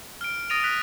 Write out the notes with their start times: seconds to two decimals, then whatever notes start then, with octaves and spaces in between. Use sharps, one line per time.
0.21 F6 D7
0.50 D#6 A6 A#6 D7 D#7 F7
0.64 F#6 B6